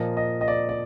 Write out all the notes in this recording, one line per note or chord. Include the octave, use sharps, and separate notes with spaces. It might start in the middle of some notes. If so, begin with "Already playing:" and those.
Already playing: A#2 F3 A#3 D#5
D#5
D#5
D5
D5